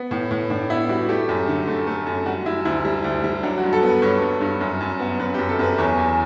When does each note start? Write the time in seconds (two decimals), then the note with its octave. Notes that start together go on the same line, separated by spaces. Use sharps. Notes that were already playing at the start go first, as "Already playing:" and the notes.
Already playing: B3
0.11 A2
0.31 A2
0.50 A2 D4
0.70 B3 E4
0.89 G3 F#4
1.09 A3 G4
1.29 F#2
1.48 D3
1.67 A3
1.87 A3
2.07 F#2
2.26 G3 F#4
2.46 G3 E4
2.65 D2 E4
2.85 G3
3.04 D2
3.24 G3
3.43 F#3 D4
3.58 F#4
3.63 G2
3.73 A4
3.83 B3 B4
4.02 G2 C#5
4.22 G2
4.41 G2
4.61 F#2
4.81 F#2
5.00 B3
5.20 F#2 B4
5.34 G4
5.39 F#2
5.49 A4
5.59 F#2 B4
5.78 E2 C#5
5.98 E2